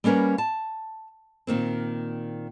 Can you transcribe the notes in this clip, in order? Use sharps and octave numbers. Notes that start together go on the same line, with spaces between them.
G3 A#3 C#4 A#4 B4
A5
A#2 D#3 A#3 C4